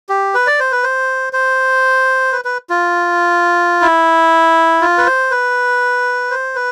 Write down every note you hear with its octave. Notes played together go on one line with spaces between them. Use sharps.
G4
B4
D5
C5
B4
C5
C5
B4
B4
F4
E4
F4
B4
C5
B4
C5
B4